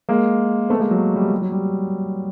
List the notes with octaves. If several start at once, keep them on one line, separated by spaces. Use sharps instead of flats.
G#3 A#3
A3 B3
G#3 A#3
F#3
G3
G3
F#3
G3